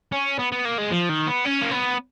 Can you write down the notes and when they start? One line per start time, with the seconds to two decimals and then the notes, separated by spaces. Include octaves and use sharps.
0.12 C#4
0.39 B3
0.52 B3
0.65 A#3
0.78 G#3
0.91 F3
1.09 D#3
1.27 B3
1.45 C#4
1.61 A#3
1.71 B3